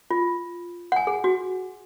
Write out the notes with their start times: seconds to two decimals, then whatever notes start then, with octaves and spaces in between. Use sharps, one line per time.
0.11 F4
0.92 F#5 G#5
1.07 G#4
1.24 F#4